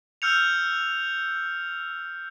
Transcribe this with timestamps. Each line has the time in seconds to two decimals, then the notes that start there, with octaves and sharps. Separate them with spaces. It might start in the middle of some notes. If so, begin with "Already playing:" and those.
0.22 E6 F6 G6 C#7 F7